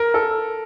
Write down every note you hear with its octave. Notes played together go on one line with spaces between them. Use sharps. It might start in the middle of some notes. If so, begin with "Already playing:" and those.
Already playing: A#4
A4